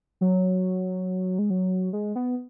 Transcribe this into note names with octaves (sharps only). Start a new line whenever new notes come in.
F#3
G#3
F#3
G#3
B3